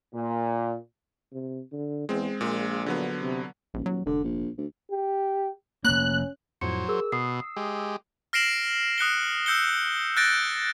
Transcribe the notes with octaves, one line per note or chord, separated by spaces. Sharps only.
A#2
C3
D3
E2 G#3 C4
A#1 A#2 G#3
D3 F#3 B3
C3
D#1 A#1
F#3
F1 D3
A#1
D2
G4
F1 A#3 C#4 F#6
F2 A2 F#3 C5 G#6 C#7
G#4 A#4 E6
B2 D#6 C7
G#3 G4
F6 A#6 C7 D7 E7 F#7
D#6 F#6 C#7 G7
E6 G6 C#7 G7
F#6 G6 A6 A#6 D7